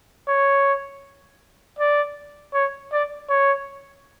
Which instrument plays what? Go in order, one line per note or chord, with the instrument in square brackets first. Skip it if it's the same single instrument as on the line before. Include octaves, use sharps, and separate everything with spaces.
[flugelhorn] C#5
D5
C#5
D5
C#5